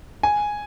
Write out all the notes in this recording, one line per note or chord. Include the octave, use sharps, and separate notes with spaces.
G#5